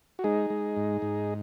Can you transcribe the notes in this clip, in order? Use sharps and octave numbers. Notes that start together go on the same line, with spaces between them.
F#4
G#3 D#4 G#4
G#3
G#2
G#2